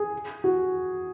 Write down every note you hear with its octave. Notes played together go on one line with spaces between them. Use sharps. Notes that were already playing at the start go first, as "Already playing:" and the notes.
Already playing: G#4
F#4